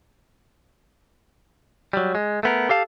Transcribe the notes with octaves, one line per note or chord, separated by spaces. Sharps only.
F#3 G3
G#3
A3 B3 A#4
G4 A4 F5 A5